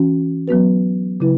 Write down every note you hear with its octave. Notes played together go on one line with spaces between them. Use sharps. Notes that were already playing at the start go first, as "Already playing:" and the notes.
Already playing: E3 C#4 F#4
F#3 B3 F#4 B4
C#3 F#3 E4 B4